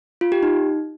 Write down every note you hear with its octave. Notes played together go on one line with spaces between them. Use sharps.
F4
G4
D#4